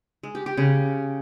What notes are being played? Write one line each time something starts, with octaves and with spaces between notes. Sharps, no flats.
G#3
G4
G4
C#3